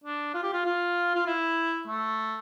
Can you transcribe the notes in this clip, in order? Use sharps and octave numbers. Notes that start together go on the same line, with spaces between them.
D4
F4
G4
F4
F4
F4
E4
A3